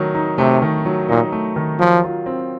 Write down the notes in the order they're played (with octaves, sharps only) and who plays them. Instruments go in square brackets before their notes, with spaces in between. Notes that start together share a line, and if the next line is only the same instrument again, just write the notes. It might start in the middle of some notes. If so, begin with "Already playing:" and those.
Already playing: [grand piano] D#3 F#3 A3
D#4
[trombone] C3 [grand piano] A3
[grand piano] D#3
F#3
[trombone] A#2 [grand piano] D#4
[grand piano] A3
D#3
[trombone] F3 [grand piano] F#3
[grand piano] F4
C4